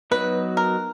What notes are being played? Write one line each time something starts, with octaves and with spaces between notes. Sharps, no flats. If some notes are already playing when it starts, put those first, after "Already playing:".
F#3 B3 D#4 F#4 B4
A#4